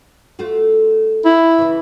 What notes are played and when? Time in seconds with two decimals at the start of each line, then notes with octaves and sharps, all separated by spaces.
0.39 A3 F4 F#4
1.25 E4
1.58 C#3 E3